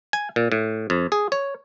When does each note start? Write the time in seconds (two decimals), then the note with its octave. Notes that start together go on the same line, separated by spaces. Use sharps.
0.13 G#5
0.36 A#2
0.52 A2
0.90 F2
1.12 G#4
1.32 C#5